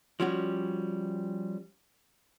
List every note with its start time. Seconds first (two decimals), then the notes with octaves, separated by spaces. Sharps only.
0.20 F3 G3 C#4 F#4